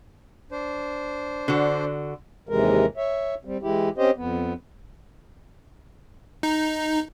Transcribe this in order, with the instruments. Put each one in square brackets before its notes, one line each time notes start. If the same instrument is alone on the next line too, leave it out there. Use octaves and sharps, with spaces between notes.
[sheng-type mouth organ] D4 C5
[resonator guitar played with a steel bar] D3 F#4
[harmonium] D#2 C3 E3 G#3 A#4
C#5 E5
G3 C4
E3 G#3 E4 G4
C4 C#4 G4 C5 D#5
F2 B3
[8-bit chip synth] D#4